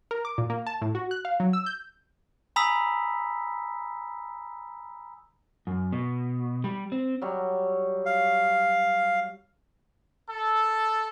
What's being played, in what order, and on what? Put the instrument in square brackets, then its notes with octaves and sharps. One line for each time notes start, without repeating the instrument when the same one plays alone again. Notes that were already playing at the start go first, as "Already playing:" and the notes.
[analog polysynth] A#4
D6
A#2
A#3
A5
A2
F#4
F#6
F5
F#3
E6
G6
[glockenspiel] G#5 A#5 B5 D#6 E6 B6
[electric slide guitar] F#2
B2
G3
C4
[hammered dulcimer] F#3 G3
[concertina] F5
[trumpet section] A4